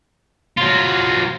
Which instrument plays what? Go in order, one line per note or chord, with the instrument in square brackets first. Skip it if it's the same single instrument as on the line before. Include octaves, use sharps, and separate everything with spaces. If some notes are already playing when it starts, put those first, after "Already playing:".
[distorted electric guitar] F#3 F4